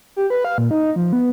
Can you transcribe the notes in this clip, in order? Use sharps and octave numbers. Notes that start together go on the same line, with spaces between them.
G4
B4
F5
A#2
D#4
F3
B3